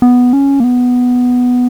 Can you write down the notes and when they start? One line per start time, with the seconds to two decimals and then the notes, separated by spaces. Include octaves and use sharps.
0.02 B3
0.33 C#4
0.60 A#3
0.64 B3